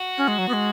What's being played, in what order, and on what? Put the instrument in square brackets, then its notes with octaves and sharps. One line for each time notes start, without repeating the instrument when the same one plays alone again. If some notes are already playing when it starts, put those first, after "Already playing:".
Already playing: [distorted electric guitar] F#4
[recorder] C#4
G#3
F#3
B3
G#3